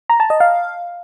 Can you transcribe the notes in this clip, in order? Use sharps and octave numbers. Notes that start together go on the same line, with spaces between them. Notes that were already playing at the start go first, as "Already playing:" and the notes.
A#5
A5
D#5
F5